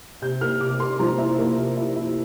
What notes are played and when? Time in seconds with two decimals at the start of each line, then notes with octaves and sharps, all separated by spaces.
0.22 C3 G6
0.41 A#3 F6
0.60 C3 D6
0.79 A#3 C6
0.99 F3 A#5
1.18 E4
1.38 A#3
1.57 C3
1.77 E4
1.96 E4